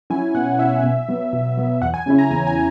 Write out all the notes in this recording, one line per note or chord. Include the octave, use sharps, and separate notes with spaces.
F#3 C#4 E4 G#5
B2 F#5
F#3 C#4 E4 E5
B2
F#3 B3
B2
F#3 B3
E2 F#5
G#5
C#3 F#3 C#4 E4
A#5
E2 G#5
G#5